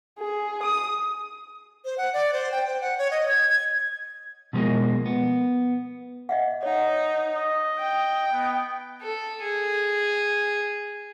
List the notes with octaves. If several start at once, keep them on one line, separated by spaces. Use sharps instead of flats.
G#4
D#6
C5
F#5
D5
C5
G5
C5
F#5
C#5
D#5
G#6
G#6
B2 F3 G3 G#3 A#3
B3
D#5 E5 F#5
D#4 C#5 F#5
D#5
G5
B3
A4
G#4